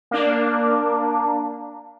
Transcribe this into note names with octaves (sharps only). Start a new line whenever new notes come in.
A#3 D4